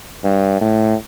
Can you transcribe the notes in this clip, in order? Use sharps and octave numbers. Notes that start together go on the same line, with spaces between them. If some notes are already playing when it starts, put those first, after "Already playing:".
G2
A2